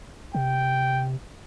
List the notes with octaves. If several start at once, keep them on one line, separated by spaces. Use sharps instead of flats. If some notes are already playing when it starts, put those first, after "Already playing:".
C3 G5